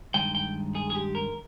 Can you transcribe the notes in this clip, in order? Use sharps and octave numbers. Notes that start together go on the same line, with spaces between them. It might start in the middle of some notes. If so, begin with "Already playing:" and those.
G2 D#3 G#3 G5
G5
G#4
G#4
G4
A#4